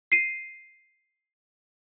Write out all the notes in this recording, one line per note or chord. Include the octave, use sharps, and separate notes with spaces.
C7 D#7